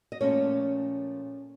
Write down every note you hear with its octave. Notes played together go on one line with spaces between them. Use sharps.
D#5
A#2 F3 A3 C#4 C#5